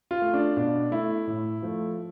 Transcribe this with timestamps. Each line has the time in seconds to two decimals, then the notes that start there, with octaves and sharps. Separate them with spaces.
0.11 F4
0.22 A3
0.34 D4
0.57 B2 D4
0.91 A3 E4
1.27 A2
1.62 F3 A3